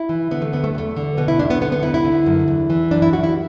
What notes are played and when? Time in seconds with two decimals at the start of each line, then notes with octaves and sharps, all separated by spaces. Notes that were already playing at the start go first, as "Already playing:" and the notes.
Already playing: E4
0.09 E3
0.31 D3 B3
0.42 A3
0.53 D2 B3
0.64 A3
0.75 E2 A3
0.96 D3
1.17 B2 B3
1.28 E4
1.39 E2 D4
1.50 B3
1.61 D3 B3
1.72 B3
1.83 D2 E4
1.94 E4
2.05 D3
2.26 F#2
2.48 E2
2.70 E3
2.91 F#2 D4
3.02 E4
3.13 F#2 F#4
3.23 E4